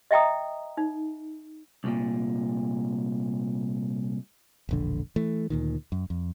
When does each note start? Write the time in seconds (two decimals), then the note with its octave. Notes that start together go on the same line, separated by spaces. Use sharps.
0.11 D#5 E5 G5 A#5 D#6
0.77 D#4
1.84 C2 A#2
4.69 E1 A#1 D3
5.16 E3 A3
5.50 D2 A#2 D#3
5.92 F#2
6.10 F2